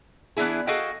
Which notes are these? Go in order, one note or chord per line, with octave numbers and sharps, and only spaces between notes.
E3 B3 C4 D4 E4 G#4
F#4 G#4 A4 D#5 F5 G5